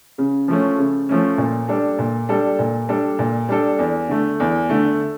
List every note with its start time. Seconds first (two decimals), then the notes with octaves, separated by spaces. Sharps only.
0.18 C#3
0.48 F3 A3 C#4
0.78 C#3
1.09 F3 A3 C#4
1.38 A#2
1.68 G3 D4 A4
1.99 A#2
2.29 G3 D4 A4
2.59 A#2
2.89 G3 D4 A4
3.19 A#2
3.49 G3 D4 A4
3.79 E2
4.09 D3 A3
4.40 E2
4.69 D3 A3